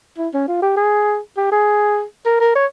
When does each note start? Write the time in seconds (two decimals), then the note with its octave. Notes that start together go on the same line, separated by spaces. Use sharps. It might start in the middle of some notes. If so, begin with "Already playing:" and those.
0.18 E4
0.34 C#4
0.48 F4
0.62 G4
0.77 G#4
1.37 G4
1.52 G#4
2.25 A#4
2.41 A#4
2.56 C#5